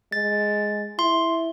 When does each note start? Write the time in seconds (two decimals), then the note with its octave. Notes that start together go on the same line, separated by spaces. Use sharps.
0.12 G#3 A6
0.99 E4 C6